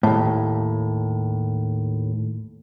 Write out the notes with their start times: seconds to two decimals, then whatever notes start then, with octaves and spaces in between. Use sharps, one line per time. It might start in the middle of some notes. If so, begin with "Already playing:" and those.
0.03 D#2 A2